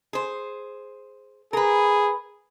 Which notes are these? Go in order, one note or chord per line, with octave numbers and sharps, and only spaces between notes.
G#4 C5
G#4 A#4 B4